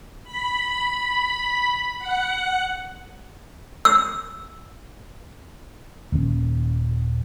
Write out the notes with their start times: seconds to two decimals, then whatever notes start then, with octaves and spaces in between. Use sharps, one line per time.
0.24 B5
1.99 F#5
3.85 E6
6.12 D#1 D#3 C#4